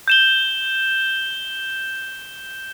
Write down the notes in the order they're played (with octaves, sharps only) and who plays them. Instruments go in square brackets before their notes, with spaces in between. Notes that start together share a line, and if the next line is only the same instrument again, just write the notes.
[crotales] G6 E7 G7